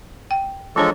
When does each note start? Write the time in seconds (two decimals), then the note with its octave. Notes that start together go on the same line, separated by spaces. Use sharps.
0.31 G5
0.76 E3 F3 G#3 D4 A4 C#5